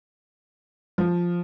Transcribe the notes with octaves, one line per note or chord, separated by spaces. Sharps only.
F3